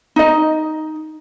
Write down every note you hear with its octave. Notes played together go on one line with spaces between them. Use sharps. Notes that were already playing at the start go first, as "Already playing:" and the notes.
D#4 D#5